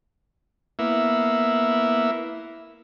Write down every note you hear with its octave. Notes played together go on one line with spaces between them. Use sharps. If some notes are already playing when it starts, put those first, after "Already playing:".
A#3 B3 E4 E5